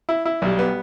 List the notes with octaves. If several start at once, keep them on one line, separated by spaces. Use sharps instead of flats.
E4
E4
B1 G3
B3